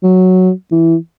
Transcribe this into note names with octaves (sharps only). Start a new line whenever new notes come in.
F#3
E3